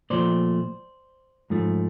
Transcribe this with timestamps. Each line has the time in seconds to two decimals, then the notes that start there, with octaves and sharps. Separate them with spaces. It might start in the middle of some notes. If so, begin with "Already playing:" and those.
0.10 A#2 F3 A3 C5 D5
1.50 G#2 F3 A3